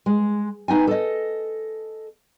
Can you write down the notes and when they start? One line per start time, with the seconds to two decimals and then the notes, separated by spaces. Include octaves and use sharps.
0.06 G#3
0.68 B3 D#4 G5 G#5
0.87 A4 D#5